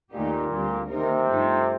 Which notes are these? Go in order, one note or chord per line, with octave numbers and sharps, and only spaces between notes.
D#2 A#2 D#3 A3 D#4 G4
D2 D3 G3 C4 G4
C3 D#3 A#3 D#4 A#4
G2 F3 A3 D#4 A4